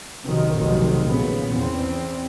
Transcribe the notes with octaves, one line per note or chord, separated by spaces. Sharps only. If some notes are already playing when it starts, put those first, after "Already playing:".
B1 C3 D#3
F1 B1 C3 D#3
A#2 C#3 B3
E2 C4